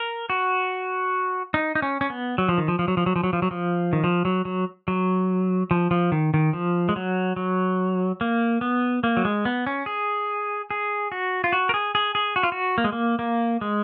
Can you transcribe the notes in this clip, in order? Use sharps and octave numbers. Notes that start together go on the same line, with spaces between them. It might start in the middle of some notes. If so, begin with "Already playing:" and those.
Already playing: A#4
F#4
D#4
D#4
C#4
C#4
B3
F#3
F3
D#3
F3
F3
F#3
F3
F#3
F3
F#3
F3
F#3
F3
D#3
F3
F#3
F#3
F#3
F3
F3
D#3
D#3
F3
G#3
F#3
F#3
A#3
B3
A#3
F#3
G#3
B3
C#4
G#4
G#4
F#4
F4
F#4
A#4
G#4
G#4
G#4
F#4
F4
F#4
A#3
G#3
A#3
A#3
G#3